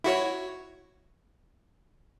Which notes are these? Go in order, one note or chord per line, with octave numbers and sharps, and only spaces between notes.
E4 F#4 C#5